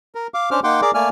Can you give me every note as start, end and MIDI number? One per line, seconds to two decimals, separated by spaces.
0.15 0.27 70
0.34 0.50 77
0.34 0.50 86
0.51 0.60 61
0.51 0.60 62
0.51 0.60 72
0.51 0.60 86
0.51 0.60 89
0.64 0.81 58
0.64 0.81 63
0.64 0.81 78
0.64 0.81 79
0.64 0.81 84
0.64 0.81 86
0.82 0.91 68
0.82 0.91 70
0.82 0.91 74
0.82 0.91 86
0.94 1.09 57
0.94 1.09 58
0.94 1.09 74
0.94 1.09 80
0.94 1.09 89